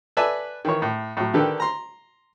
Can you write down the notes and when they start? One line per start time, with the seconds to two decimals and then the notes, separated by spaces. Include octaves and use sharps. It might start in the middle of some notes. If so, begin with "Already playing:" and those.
0.17 A4 B4 D5 E5 G#5 A5
0.65 D#3 E3 C#5
0.82 A2
1.17 A2 F#3
1.34 D3 D#3 D4 G4 A4 B4
1.60 A#5 C6